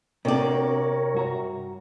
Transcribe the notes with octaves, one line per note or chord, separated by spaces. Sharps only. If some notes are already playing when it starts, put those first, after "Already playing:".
C3 B3 D4 F#4 A#4 C#5 D5
G2 F#4 A#5